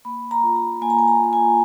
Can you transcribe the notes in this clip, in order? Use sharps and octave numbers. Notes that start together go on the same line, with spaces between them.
A#3 B5
A#5
F4
A#5
A#3 G#5
A#5
G#5
A#5
G#5
F4 A#5
G#5